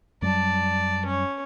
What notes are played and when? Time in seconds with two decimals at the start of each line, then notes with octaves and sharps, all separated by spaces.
0.22 F#2 F#3 G3 D5 A5
1.05 C#4 C#5